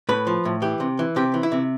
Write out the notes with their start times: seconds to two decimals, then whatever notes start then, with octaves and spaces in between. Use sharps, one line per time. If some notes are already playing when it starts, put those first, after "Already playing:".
0.09 A2 B4
0.27 F3
0.45 A2
0.62 E3 G4
0.80 C3
0.99 E3
1.16 C3 G4
1.34 E3
1.43 E4
1.52 C3